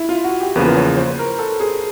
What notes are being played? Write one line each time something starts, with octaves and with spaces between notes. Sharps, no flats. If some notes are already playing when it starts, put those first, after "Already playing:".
Already playing: E4
F4
F#4
G4
E2 C#3 F3 A#3 B4
C#5
C5
A#4
A4
G#4